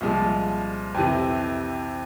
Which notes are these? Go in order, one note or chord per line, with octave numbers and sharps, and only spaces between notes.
C2 A#2 F3 G#3
F2 C3 E3